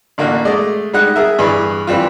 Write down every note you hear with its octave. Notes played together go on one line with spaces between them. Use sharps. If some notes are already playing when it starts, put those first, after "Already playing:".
A1 D3 A#3 D4 F#4
G#3 A3 D5 D#5
G3 G#3 D#4 F#5 F#6
G#4 A#4 E5
G2 E3 G#4 D5 C#6
E3 G3 C4 F4